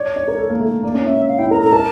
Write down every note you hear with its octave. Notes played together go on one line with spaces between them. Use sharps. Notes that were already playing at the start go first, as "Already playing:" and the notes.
Already playing: C#5 D5
D5
A#4
A4
A#3
A3
A#3 D5
C#4
C#4 E5
F5
E4 G5
A#4 A#5
A4 A#5
A#4 A5